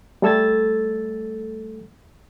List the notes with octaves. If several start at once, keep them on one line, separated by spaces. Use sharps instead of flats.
G3 A3 A4 E6 G#6 A6